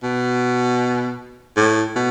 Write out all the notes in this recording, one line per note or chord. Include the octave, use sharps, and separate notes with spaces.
B2
A2
B2